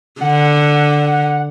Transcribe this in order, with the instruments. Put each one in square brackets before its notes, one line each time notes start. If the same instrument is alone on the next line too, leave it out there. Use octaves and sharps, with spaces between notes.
[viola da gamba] D3 [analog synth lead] F#5